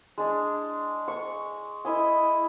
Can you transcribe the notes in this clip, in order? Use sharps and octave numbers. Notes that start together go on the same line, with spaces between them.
G#3 D4
C#6
E4 D#5 G#5